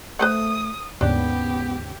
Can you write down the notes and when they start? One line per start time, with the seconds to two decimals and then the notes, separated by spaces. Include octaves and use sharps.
0.19 A3 B4 C5 F#5 D#6
1.01 D#2 G#2 C#3 B3 D4 G4